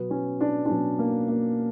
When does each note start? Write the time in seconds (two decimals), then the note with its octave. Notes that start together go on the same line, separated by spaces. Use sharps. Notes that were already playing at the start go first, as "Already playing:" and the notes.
Already playing: B2 F#3 B3
0.10 C#4
0.41 D4
0.66 D4
0.69 B2 F#3 C#4
0.99 A#3
1.28 A#3